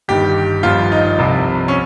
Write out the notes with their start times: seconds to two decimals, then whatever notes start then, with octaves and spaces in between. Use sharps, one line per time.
0.08 G1 G2 D#3 G4
0.63 G#1 G2 F3 F4
0.92 D#4
1.18 C2 C3 F3
1.68 C#4